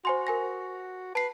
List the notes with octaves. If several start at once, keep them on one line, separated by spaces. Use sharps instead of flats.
F#4 C5 G#5 C6
A#4 G#5 A#6
B4 A5 C7